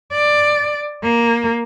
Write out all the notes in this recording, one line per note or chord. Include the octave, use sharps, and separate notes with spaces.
D5
A#3